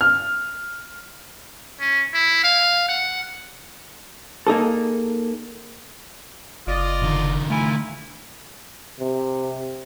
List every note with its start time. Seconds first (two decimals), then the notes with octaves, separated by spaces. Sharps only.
0.01 F6
1.80 C#4
2.13 E4
2.43 F5
2.88 F#5
4.47 A#3 D#4 G#4 A4
6.67 F#1 F4 D5 D#5
7.03 D3 D#3
7.50 A3 E4 F4 G#5
9.00 C3